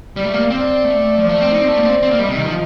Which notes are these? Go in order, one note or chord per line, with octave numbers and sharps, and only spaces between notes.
G3 D5
A3
A#3
C4 D5
A3
F3 D5
A3
C4
D#4
C4
A3
A#3
C4
C4
A#3
G3 D#5
C3
D#3
F3